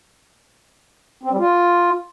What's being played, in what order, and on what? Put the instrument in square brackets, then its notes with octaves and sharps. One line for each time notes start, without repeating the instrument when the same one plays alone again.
[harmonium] C4
G3
F4